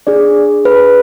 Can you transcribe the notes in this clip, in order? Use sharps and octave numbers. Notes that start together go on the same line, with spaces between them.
D4 G#4 D5
B4